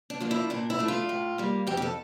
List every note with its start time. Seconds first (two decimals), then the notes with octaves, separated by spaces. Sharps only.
0.10 D4
0.20 F3 A#3 D4
0.31 E4
0.50 A#2 D4
0.70 E4
0.79 F3 A3 D4
0.88 F4
1.09 A2
1.38 G3 A#3
1.67 F2 G4
1.77 G4
1.82 A4